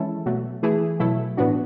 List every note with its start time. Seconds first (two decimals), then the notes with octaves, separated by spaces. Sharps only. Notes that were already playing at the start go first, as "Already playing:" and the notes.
Already playing: E3 G#3 C#4 E4 A4
0.26 B2 F#3 A3
0.63 E3 A3 E4 G#4
0.99 B2 F#3 A3 E4 A4
1.37 A2 E3 B3 D4 F#4